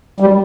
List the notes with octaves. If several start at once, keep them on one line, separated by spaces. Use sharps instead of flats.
G3